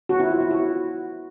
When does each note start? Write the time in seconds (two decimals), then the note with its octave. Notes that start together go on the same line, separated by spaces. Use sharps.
0.09 F#4
0.20 E4
0.30 F4
0.40 E4
0.51 F#4